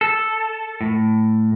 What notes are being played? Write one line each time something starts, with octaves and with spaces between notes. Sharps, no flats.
A4
A2